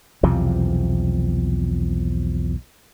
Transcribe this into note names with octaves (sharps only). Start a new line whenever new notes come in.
B1 E2 C3 F3